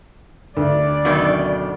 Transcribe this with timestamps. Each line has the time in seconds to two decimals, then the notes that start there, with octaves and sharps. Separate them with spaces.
0.57 D2 D5
1.05 F#2 B2 D#3